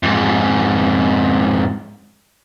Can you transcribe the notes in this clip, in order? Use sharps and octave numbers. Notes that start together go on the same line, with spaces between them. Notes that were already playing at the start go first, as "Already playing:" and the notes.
F2 G#2